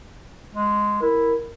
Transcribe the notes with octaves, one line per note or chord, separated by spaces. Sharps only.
G#3
E4 A#4